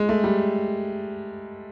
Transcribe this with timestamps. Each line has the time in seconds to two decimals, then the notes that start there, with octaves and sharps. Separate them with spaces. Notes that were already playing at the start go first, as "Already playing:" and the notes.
Already playing: G#3
0.09 A3
0.24 G3